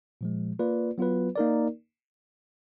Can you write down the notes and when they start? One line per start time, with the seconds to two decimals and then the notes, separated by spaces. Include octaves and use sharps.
0.21 A#2 F3 G#3
0.59 A#3 F4 B4 D5
0.98 F#3 B3 F4 B4
1.36 A#3 D#4 A#4 D5